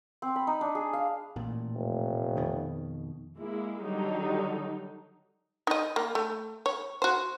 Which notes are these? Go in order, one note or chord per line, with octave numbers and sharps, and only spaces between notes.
C4
B5
D#4
D4
G#4
F5
A1 A#2
F1
F2 B2 D#3
G#3 A#3 E4
D3 D#3 F#3 G3 D#4
D#4 D#5
A#3
A3
C#5
F#4 C5